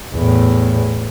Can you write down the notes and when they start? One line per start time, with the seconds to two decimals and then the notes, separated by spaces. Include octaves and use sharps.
0.14 E2 A2